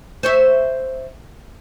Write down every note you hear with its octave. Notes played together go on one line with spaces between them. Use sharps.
C5 C#5 E5